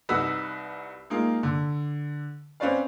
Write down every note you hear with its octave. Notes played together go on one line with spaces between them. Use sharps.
C2 D#4 F#4 B4 E6 B6
G#3 A#3 D#4 F4
D3
C4 C#4 B4 C#5 D5 F5